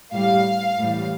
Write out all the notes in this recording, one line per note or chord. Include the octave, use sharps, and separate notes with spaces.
A2 G3 F5
A2 E3 G3